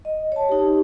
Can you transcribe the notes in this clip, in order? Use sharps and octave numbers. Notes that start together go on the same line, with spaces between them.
D#5
C#5 A5
D#4 G4